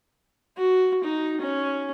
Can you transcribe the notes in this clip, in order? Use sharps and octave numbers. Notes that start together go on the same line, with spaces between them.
F#4
D#4
C#4